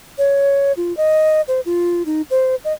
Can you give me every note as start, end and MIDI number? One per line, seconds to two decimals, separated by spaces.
0.18 0.72 73
0.77 0.95 65
0.97 1.41 75
1.48 1.60 72
1.65 2.03 65
2.06 2.22 63
2.31 2.55 72
2.64 2.72 75